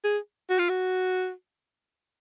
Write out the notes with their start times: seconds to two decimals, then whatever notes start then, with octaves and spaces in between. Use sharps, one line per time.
0.04 G#4
0.49 F#4
0.59 F4
0.69 F#4